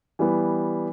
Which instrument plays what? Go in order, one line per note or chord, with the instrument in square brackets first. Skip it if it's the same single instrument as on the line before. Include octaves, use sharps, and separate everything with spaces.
[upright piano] E3 G3 B3